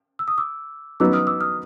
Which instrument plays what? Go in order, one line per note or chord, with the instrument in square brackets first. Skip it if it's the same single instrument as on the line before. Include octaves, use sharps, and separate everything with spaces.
[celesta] E6
D#6
D6 E6
[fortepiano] F#3 B3 D#4 F#4 [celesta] D6 E6
[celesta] D#6 F6
D6 E6
D#6 F6